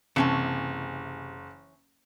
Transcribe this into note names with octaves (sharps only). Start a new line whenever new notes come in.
F#1 C3 E3 C#4 A5